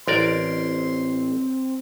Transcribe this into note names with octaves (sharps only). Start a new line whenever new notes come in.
A1 C4 A#4 D5 C6